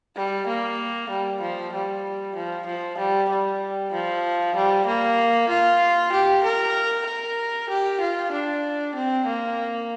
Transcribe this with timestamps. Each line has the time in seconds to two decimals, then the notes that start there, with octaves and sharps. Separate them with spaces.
0.16 G3
0.47 A#3
1.10 G3
1.41 F3
1.73 G3
2.36 F3
2.67 F3
2.98 G3
3.30 G3
3.93 F3
4.56 G3
4.86 A#3
5.49 F4
6.13 G4
6.44 A#4
7.06 A#4
7.70 G4
8.01 F4
8.32 D4
8.95 C4
9.26 A#3